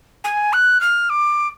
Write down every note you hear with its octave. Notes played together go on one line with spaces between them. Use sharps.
G#5
F#6
F6
D6